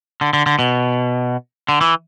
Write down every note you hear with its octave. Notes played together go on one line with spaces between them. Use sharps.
D3
D3
D3
B2
D3
E3